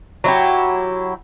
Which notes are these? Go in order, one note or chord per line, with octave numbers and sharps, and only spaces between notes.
F#3 E4 G4